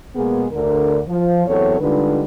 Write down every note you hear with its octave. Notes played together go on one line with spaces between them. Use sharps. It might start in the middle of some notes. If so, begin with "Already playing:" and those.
B2 G#3 A#3 B3 G#4
D2 D3 A#4
F3
E2 F#3 C4 E4 A4 C#5
D3 G3 G#3 D#4 F4 B4